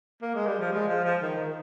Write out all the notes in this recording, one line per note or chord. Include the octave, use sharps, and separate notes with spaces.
A#3
G#3
G3
F3
G#3
F3
F3
D#3
D#3